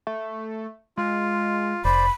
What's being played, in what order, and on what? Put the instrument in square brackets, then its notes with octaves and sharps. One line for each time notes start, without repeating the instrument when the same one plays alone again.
[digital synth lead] A3
[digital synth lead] G#3 [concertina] F4
[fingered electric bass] F1 [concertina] C5 D5 [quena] B5